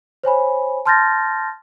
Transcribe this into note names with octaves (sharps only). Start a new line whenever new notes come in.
C5 C#5 G#5 B5
A5 C6 F6 G6 A6 A#6